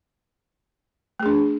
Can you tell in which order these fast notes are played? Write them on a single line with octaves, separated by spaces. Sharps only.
A3 G#4 D4